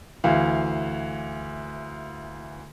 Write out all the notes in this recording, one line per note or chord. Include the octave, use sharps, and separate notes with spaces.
D2 E3 F5